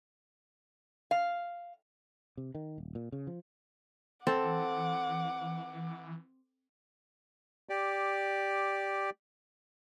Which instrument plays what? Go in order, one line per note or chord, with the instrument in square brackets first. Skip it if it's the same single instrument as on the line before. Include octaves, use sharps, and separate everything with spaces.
[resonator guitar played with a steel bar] F5
[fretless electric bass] C3
D#3
D#1
A#2
C#3
F3
[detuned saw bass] E3 [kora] C4 [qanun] A4 [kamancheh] F#5 D6
[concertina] G4 D5